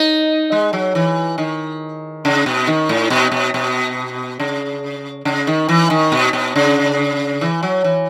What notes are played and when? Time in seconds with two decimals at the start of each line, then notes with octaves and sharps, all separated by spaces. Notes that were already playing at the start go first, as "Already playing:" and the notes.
Already playing: D#4
0.52 G#3
0.73 F#3
0.95 E3
1.38 D#3
2.25 C#3
2.46 B2
2.67 D#3
2.89 A2
3.10 B2
3.32 B2
3.54 B2
4.40 C#3
5.25 C#3
5.47 D#3
5.69 E3
5.90 D#3
6.12 B2
6.33 B2
6.56 C#3
7.41 E3
7.63 F#3
7.84 E3